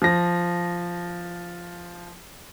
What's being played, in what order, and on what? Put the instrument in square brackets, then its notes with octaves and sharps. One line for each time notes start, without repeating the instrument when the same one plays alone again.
[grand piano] F3 A#6